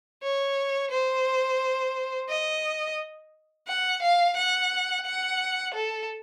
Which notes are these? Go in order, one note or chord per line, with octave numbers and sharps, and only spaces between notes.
C#5
C5
D#5
F#5
F5
F#5
F#5
A4